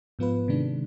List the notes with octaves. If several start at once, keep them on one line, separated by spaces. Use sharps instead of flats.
G#2 F3 B3 F4 B4
C3 D#3 G#3 D4